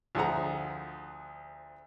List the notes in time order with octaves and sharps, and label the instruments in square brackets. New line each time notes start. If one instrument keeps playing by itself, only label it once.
[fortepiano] D2 F3 F4 G#4 F#5 A#5